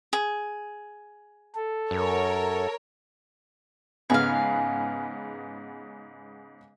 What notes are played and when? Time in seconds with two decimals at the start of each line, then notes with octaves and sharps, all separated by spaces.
0.13 G#4
1.55 A4
1.91 F#2 A#4 C#5
4.10 G#2 C#3 B3 G#4 F5